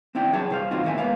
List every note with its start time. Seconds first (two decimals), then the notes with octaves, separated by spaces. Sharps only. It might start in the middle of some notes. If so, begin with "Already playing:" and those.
0.15 C4 D4 E4 G5
0.33 F#3 G#4 C#5 A5
0.50 C2 C5 F5
0.71 E2 A#2 C4 D#4 F4 F#4
0.84 D#2 A2 A#3 F#4 E5 G#5
0.98 G#3 A#3 B3 F5